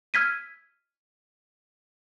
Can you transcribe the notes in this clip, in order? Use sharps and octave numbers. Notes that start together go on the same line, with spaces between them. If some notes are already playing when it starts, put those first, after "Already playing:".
E6 F6 G#6 B6 D#7